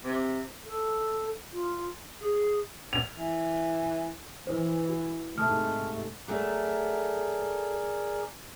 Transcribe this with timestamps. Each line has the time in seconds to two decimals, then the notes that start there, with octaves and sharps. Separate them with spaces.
0.04 C3
0.66 A4
1.53 F4
2.20 G#4
2.93 F7
3.14 E3
4.47 E3 C5
4.89 F#4
5.38 G#2 C3 A3 A5 D#6 F6
6.28 F#3 A3 G#4 A#4 D5